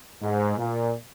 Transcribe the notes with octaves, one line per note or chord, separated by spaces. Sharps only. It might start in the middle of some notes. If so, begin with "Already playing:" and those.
G#2
A#2